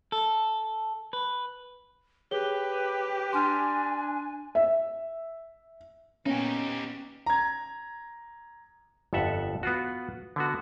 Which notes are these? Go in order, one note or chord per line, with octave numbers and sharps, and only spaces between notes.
A4
B4
G4 G#4 B4 C#5 G7
D4 G#5 C6 F6
E5
A#2 B3 C#4 D#4 G4
A#5 G#6
G1 F2 A4 E5 F#5
B3 F4 F#4
D3 B3 F#4